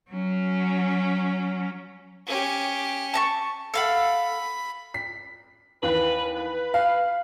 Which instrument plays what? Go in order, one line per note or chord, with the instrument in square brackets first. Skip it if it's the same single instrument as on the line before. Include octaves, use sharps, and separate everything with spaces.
[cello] F#3 C#4
[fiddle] C#4 G4
[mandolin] A5 A#5 C#6
[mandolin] A4 F5 F#5 [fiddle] B5
[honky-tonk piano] B6
[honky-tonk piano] D#2 E3 [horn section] B4
[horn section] B4
[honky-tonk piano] F5